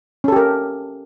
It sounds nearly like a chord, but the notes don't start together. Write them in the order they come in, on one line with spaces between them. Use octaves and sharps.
C#4 A4 G4 A#4